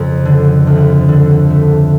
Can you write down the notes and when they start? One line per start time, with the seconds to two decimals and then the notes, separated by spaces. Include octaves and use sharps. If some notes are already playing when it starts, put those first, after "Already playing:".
Already playing: F2 C#3
0.25 D3
0.67 D2
1.09 D3
1.50 A3